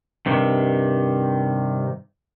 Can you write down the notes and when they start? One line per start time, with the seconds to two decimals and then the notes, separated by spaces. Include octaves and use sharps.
0.26 G2 C3 D#3